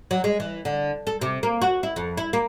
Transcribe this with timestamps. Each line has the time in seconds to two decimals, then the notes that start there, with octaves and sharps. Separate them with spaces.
0.11 F#3
0.24 G#3
0.40 E3
0.65 D3
1.07 A4
1.21 C3
1.43 A#3
1.62 F#4
1.83 E4
1.96 F2
2.17 E4
2.33 A#3